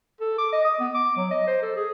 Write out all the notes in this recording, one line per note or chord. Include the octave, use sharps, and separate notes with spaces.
A4
D6
D#5
D#6
B3
D6
F#3
D#5
C5
A4
G#4